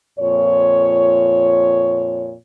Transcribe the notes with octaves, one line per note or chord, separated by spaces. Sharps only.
F2 A#2 C#5